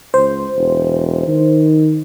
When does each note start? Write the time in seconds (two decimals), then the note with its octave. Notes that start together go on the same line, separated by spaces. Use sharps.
0.14 C#2 C5
0.56 E1
1.27 D#3